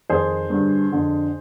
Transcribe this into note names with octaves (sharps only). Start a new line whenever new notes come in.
F2 D#3 G#4 C5
G2 D3
F2 D3